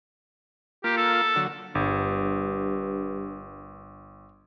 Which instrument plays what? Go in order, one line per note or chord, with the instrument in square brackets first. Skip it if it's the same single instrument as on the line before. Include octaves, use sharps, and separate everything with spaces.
[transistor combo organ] A#3 F4 [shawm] G4
[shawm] A4
[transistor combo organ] D3 F#3
[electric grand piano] G1 [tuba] G2